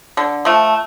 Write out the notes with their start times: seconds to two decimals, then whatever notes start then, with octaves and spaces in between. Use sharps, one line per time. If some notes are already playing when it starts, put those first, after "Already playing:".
0.17 D3
0.45 F3 A3